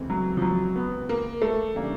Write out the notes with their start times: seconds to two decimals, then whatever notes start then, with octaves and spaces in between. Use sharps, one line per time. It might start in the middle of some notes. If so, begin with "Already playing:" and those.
Already playing: C#2 C3 E3 A3 C4
0.10 F#3
0.37 F3
0.42 F#3
0.76 B3
1.09 A#3
1.42 A3
1.75 C#3 E3 G3 A#3 D4